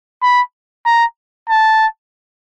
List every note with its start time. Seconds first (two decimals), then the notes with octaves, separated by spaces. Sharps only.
0.22 B5
0.86 A#5
1.49 A5